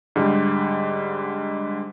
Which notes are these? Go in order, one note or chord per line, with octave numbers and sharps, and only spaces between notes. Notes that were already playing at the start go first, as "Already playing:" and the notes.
G#2 D3 G3